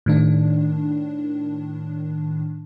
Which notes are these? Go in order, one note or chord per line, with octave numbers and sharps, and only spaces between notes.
A2 D#3 D4